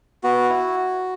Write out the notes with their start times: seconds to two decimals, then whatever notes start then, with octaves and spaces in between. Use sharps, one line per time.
0.24 B3 F#4
0.49 E4